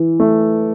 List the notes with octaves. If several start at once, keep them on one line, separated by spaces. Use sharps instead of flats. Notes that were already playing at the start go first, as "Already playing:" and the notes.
Already playing: E3
A3